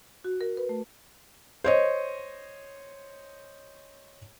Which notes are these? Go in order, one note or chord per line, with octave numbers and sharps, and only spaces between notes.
F#4
A#4
B4
A3
C5 C#5 D#5